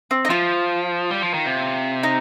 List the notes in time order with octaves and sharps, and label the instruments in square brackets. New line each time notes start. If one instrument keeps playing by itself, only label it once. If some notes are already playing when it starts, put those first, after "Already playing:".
[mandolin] C4
D#4
[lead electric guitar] F3 [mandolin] F4
[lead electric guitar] G3
F3
D#3
C3
[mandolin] D#4